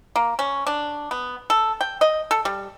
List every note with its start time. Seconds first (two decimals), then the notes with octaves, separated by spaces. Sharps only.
0.16 A#3
0.39 C#4
0.67 D4
1.11 B3
1.50 A4
1.81 G5
2.01 D#5
2.31 A4
2.45 G3